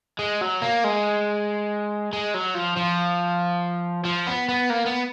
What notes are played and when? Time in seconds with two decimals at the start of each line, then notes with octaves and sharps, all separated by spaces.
0.19 G#3
0.41 F#3
0.62 A#3
0.84 G#3
2.13 G#3
2.34 F#3
2.55 F3
2.77 F3
4.05 F3
4.27 B3
4.49 B3
4.70 A#3
4.86 B3